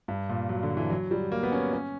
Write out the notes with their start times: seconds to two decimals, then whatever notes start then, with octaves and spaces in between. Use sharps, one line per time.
0.08 G2
0.29 A#2
0.49 F#3
0.63 D3
0.77 E3
0.90 F#3
1.11 G3
1.32 A#3
1.43 B3
1.52 C#4
1.73 C#4